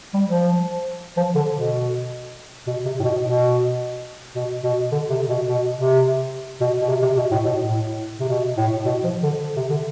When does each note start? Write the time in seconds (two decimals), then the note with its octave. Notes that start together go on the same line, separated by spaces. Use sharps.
0.14 G3
0.28 F3
1.17 F3
1.35 D3
1.54 B2
2.67 B2
2.85 C3
3.00 A2
3.04 B2
3.23 B2
4.35 B2
4.63 B2
4.92 D3
5.10 C3
5.29 B2
5.48 B2
5.76 C3
6.61 B2
6.81 B2
6.89 C3
7.02 C3
7.17 B2
7.31 A2
7.45 B2
7.59 A2
8.20 C3
8.29 B2
8.57 A2
8.85 B2
9.04 F3
9.23 D3
9.56 C3
9.70 D3